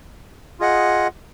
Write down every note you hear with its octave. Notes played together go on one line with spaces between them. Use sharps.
F4 G#4 D#5 F#5